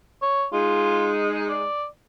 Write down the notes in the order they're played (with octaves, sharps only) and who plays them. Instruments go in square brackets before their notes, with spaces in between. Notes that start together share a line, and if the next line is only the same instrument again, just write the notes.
[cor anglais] C#5
[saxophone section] G#3 D#4 [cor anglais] F4
[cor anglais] D5